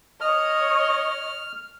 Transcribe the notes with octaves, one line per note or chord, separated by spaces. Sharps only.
C#5 D#5 F6